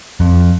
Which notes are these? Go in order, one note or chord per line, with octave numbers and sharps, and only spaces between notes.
F2